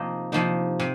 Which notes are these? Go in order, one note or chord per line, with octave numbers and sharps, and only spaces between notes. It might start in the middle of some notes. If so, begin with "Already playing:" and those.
Already playing: C3 F3 A#3 D#4
C3 F3 A#3 D#4
C3